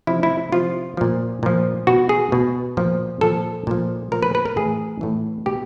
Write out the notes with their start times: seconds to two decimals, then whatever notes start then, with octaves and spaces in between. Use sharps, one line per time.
0.07 C3 F3 E4
0.23 E4
0.52 C3 F3 F4
0.97 A#2 F3
1.43 A#2 F3
1.87 B2 F#4
2.09 G#4
2.32 B2
2.77 A#2 F3
3.21 A#2 F3 A4
3.67 A#2 F3
4.12 A#2 F3 A#4
4.23 B4
4.35 B4
4.45 A#4
4.57 A2 E3 G#4
5.01 A2 E3
5.46 B2 G4